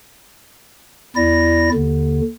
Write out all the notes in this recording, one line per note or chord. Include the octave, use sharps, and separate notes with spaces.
E2 E4 D5 A#6
D#2 D3